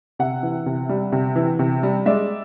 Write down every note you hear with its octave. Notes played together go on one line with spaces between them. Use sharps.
C3 E5 F#5
E3
C3
G3
C3
E3
C3
G3
G#3 D5 E5